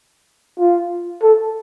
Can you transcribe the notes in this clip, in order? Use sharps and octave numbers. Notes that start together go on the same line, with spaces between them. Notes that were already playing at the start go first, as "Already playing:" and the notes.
F4
A4